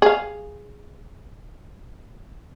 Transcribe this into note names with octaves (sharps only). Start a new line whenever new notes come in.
G#4 F5